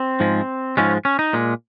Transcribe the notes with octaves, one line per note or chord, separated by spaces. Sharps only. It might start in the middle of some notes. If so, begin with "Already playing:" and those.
Already playing: C4
G#2 F3 G#3
G#2 F3 G#3 C#4
C#4
D#4
A#2 G#3